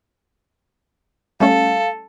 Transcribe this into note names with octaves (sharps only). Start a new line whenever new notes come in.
G3 A3 C#4 A4 F5